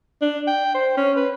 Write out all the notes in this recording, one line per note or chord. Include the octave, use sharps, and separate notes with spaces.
D4
G5
C5
C#4
B4